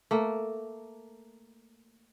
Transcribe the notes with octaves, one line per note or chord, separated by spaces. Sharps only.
A3 A#3